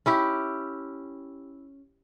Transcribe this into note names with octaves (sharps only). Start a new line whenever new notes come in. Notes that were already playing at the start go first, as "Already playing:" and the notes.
C#4 E4 G4